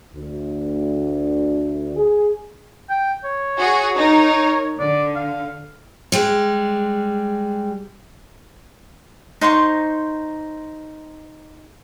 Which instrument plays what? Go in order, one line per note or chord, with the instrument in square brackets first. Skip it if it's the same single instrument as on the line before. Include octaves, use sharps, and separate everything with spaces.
[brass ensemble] D2
G#4
[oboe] G5
C#5
[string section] F#4 G#4
D#4 A#4
[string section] D3 [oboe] D5
[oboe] F5
[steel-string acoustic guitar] G3 G#3
[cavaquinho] D#4 C5 C6 C#6